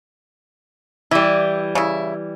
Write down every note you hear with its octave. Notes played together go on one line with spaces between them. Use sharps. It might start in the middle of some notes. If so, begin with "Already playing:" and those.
E3 G3 E4
C#3 E4